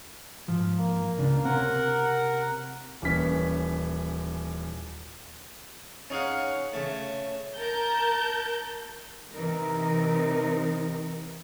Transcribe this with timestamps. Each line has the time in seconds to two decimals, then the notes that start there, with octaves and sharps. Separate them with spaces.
0.48 G#2 F3
0.78 A#3
1.18 C#2 C#3 D4
1.45 C3 C4 C#4 A#4 F#5
3.02 D#1 E3 C#4 B6
6.10 C#4 D#4 G#4 F5 F#5
6.73 C#3 A3
7.57 A#4 A5 A#5 G6
9.32 C3 E3 C4 D#4 A#4